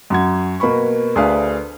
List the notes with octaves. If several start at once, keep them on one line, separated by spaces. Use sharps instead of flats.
F#2 F#4 G#6
B2 A#3 B3 B5 C#6
D2 D4 G#4 B4 F5